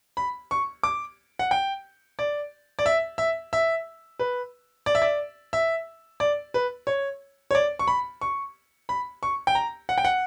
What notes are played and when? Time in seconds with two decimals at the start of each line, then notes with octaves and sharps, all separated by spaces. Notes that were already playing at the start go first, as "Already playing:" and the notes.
0.17 B5
0.51 C#6
0.83 D6
1.39 F#5
1.51 G5
2.19 D5
2.79 D5
2.86 E5
3.18 E5
3.53 E5
4.19 B4
4.86 D5
4.95 E5
5.02 D5
5.53 E5
6.20 D5
6.54 B4
6.87 C#5
7.51 C#5
7.55 D5
7.79 C#6
7.88 B5
8.21 C#6
8.89 B5
9.23 C#6
9.47 G5
9.55 A#5
9.89 F#5
9.98 G5
10.05 F#5